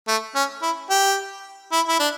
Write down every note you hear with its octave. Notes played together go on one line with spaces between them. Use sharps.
A3
C#4
E4
G4
E4
E4
D4